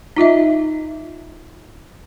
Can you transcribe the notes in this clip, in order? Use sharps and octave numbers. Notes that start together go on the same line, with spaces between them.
D#4 F4 D#5 E5